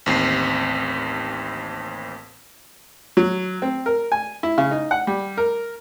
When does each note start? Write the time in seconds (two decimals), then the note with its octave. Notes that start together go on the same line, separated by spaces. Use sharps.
0.06 A1 D#2 C4 C7
3.17 F#3
3.62 C4
3.86 A#4
4.12 G#5
4.43 E4
4.58 C#3
4.71 D#4
4.91 F#5
5.07 G3
5.37 A#4